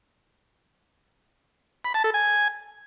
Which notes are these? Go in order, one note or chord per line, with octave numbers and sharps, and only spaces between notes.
B5
A5
A4
G#5